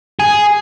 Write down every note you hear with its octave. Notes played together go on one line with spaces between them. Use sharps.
G#4